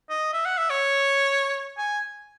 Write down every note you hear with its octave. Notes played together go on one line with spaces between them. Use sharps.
D#5
E5
F#5
E5
C#5
G#5